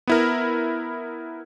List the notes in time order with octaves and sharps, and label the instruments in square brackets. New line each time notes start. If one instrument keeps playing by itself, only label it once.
[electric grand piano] B3 E4 A#4